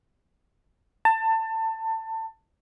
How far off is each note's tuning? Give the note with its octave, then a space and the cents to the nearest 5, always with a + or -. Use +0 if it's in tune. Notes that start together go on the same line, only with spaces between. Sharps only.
A5 +25